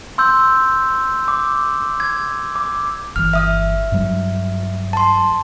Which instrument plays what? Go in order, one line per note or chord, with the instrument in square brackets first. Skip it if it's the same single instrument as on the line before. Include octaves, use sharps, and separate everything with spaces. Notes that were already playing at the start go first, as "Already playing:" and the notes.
[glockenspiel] C6 E6 G6
D6
G#6
D6
[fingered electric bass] G1 E3 [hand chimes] F6
[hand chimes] E5 D#6 F6
[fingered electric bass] G2 F#3 G3
[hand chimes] A5 C6